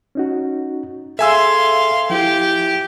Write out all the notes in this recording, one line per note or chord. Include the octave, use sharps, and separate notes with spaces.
C#4 D#4 F#4
G#4 A4 E5 F5 G#5 C6 E6
F3 E4 G4